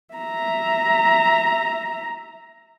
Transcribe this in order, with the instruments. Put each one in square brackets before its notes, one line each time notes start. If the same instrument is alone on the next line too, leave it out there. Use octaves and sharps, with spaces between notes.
[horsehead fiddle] E5 A#5